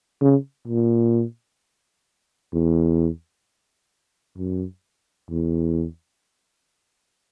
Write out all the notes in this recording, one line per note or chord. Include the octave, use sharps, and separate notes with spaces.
C#3
A#2
E2
F#2
E2